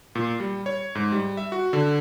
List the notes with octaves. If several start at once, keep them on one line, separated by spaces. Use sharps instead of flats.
A#2
G3
C#5
G#2
G3
E5
F#4
D3